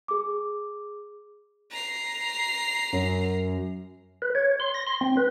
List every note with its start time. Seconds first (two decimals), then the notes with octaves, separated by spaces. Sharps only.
0.08 G#4 D6
1.71 A#5 C7
2.93 F#2
4.22 B4
4.35 C#5
4.60 C6
4.74 A#6
4.87 C6
5.01 C4
5.17 B4